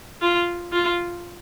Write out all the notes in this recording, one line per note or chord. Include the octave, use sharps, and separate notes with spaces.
F4
F4